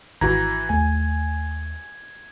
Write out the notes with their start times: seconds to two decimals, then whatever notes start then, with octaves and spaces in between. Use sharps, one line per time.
0.21 G#1 E3 F#4 A#5 G#6
0.69 D#2 A3 G#5